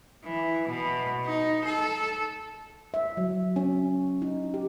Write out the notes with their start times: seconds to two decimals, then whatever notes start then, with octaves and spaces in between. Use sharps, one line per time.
0.24 E3
0.68 B2
1.25 D#4
1.65 A4
2.94 E5
3.17 F#3
3.56 C#4
4.22 D#4
4.54 G4